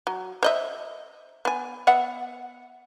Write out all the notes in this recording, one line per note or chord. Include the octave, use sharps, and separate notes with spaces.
F#3
C5 D#5 E5
B3 G#5
B3 E5 F#5